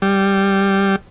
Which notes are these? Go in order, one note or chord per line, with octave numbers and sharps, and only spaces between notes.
G3